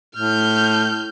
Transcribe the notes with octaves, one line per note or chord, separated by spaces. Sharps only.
A2 F6 G6